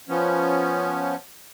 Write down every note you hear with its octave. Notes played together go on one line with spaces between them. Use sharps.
F3 B3 C#4